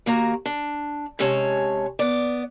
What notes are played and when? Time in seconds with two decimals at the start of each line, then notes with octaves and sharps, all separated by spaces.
0.06 D#2 A#3 F#4 A#5
0.46 D4
1.19 C3 G#3 C#4 C#5 F5 A5
1.99 B3 D5